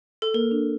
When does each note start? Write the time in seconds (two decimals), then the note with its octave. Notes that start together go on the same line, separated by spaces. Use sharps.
0.22 A4
0.34 A#3 A#4
0.51 D4